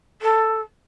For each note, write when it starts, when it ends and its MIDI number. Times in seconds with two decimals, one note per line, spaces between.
0.22 0.61 69